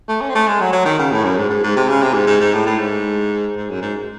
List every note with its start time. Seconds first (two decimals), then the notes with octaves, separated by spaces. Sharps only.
0.08 A3
0.21 C#4
0.29 C4
0.35 A3
0.48 G#3
0.61 F#3
0.73 F#3
0.86 D#3
0.99 C#3
1.12 A2
1.24 F#2
1.37 G#2
1.50 G#2
1.64 G#2
1.76 C3
1.89 C#3
2.03 C3
2.14 G#2
2.27 G#2
2.40 G#2
2.54 A2
2.66 A2
2.79 G#2
3.57 G#2
3.69 F#2
3.82 G#2